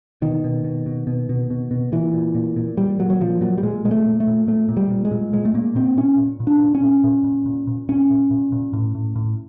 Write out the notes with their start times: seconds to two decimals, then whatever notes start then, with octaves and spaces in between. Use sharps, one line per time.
0.22 B2 D#3
0.44 B2
0.64 B2
0.86 B2
1.07 B2
1.29 B2
1.50 B2
1.71 B2
1.92 A#2 E3
2.14 A#2
2.35 A#2
2.56 A#2
2.77 A#2 G3
2.99 A#2 F#3
3.10 F#3
3.21 A#2 F3
3.41 A#2 F#3
3.58 G3
3.63 A#2 G#3
3.85 A#2 G#3
3.91 A3
4.05 A#2
4.20 A3
4.27 A#2
4.47 A#2 A3
4.69 A#2
4.77 G3
4.90 A#2
5.05 G#3
5.11 A#2
5.33 A#2 G#3
5.45 A3
5.54 A#2 A#3
5.75 A#2 C4
5.97 A#2 C#4
6.18 A#2
6.40 A#2
6.47 D4
6.61 A#2
6.75 C#4
6.82 A#2
7.04 A#2
7.24 A#2
7.46 A#2
7.67 A#2
7.89 A#2 C#4
8.10 A#2
8.31 A#2
8.52 A#2
8.73 A2
8.95 A2
9.16 A2